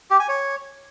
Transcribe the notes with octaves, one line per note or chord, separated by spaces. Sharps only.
G4
G#5
C#5